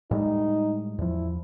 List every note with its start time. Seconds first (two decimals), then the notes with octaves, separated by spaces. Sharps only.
0.11 A2 G3 G#3 D#4
0.98 E2 F3 E4